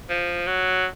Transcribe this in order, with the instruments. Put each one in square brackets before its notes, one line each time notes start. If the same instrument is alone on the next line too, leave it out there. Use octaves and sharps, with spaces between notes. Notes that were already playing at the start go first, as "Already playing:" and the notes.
[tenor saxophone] F3
F#3